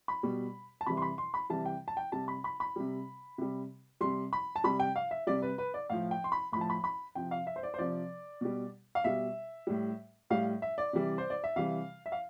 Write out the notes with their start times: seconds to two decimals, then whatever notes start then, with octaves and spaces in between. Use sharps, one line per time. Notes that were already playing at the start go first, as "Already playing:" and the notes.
0.08 B5
0.23 B2 G3
0.81 A5
0.86 C3 E3 G3 B5
0.97 C6
1.02 B5
1.18 C6
1.34 B5
1.50 C3 E3 G3 A5
1.65 G5
1.88 A5
1.97 G5
2.12 C3 G3 A5
2.28 B5
2.44 B5
2.60 B5
2.76 C3 G3
3.38 C3 G3
4.01 C3 G3 C6
4.33 B5
4.56 A5
4.64 C3 G3 B5
4.80 G5
4.96 F5
5.11 E5
5.27 C3 G3 D5
5.42 B4
5.58 B4
5.74 D5
5.90 A2 F3 F5
6.11 G5
6.24 C6
6.32 B5
6.52 A2 B5
6.56 F3 A5
6.70 B5
6.84 B5
7.15 C3 F3 G5
7.31 F5
7.47 E5
7.56 C5
7.63 D5
7.74 C5
7.78 C3 F3 D5
8.41 B2 G3
8.95 F5
9.04 B2 G3 E5
9.67 A2 G3
10.30 A2 G3 F5
10.62 E5
10.78 D5
10.93 C3 E3 G3
11.18 C5
11.30 D5
11.44 E5
11.56 C3 E3 G3 F5
12.06 E5
12.12 F5